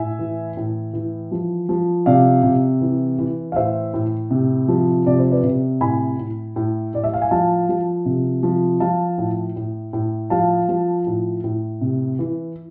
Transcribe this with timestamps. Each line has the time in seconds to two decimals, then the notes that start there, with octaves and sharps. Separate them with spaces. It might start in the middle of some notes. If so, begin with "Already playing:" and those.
Already playing: A2 E5 G#5
0.19 E3
0.57 A2
0.93 E3
1.31 F3
1.69 F3
2.06 C3 D5 F5
2.43 C3
2.81 E3
3.19 E3
3.52 F5
3.56 A2 C5 E5
3.94 A2
4.31 C3
4.68 F3
5.06 C3 D5
5.19 C5
5.31 B4 D5
5.44 C3
5.81 A2 G#5 B5
6.18 A2
6.56 A2
6.94 A2 D5
7.04 E5
7.14 F5
7.22 G#5
7.31 F3 F5 A5
7.69 F3
8.06 C3
8.43 F3
8.80 F3 F5 A5
9.18 A2
9.56 A2
9.93 A2
10.30 F3 F5 A5
10.69 F3
11.07 A2
11.44 A2
11.81 C3
12.19 E3